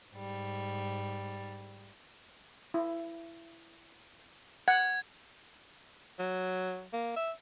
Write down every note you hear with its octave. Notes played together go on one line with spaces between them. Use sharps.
G#2 G3
E4
F#5 G#6
F#3
A#3
E5